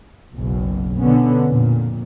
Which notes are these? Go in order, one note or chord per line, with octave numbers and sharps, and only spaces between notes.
F#1 B1 B2
B2 D3 B3 C#4
F2 A#2